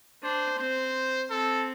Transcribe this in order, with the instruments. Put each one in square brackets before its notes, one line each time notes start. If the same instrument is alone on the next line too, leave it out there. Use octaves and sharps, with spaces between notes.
[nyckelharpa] D4 [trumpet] C5
[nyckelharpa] C4 [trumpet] C5
[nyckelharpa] C4 [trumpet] A4